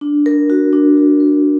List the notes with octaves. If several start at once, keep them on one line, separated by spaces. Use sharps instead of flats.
D4
A#4
F#4
D4
F#4
A#4